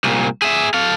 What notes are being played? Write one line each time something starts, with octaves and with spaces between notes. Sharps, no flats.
C2 A#2
G#4 E5
A4 F5